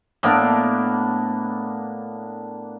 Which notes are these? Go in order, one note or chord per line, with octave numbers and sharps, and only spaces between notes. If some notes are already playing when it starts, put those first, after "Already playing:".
A2 A#3 B3 D4